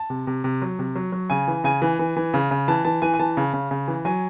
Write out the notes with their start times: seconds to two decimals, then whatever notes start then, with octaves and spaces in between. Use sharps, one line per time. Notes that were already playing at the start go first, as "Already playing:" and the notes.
Already playing: A5
0.10 C3
0.27 C3
0.44 C3
0.62 F#3
0.79 C3
0.96 F#3
1.12 F#3
1.30 C#3 G#5
1.48 E3
1.64 C#3 G#5
1.82 E3
1.99 E3
2.16 E3
2.34 C#3
2.51 C#3
2.68 E3 A5
2.85 E3 A5
3.02 E3 G#5
3.14 G#5
3.19 E3 A5
3.37 C#3
3.53 C#3
3.71 C#3
3.88 E3
4.05 F#3 G#5